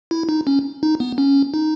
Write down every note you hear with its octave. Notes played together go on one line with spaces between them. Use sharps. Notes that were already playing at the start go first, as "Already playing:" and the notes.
E4
D#4
C#4
D#4
B3
C#4
D#4